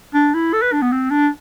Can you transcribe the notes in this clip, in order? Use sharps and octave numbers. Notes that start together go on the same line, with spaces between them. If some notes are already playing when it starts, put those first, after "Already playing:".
D4
E4
A4
B4
D4
B3
C4
D4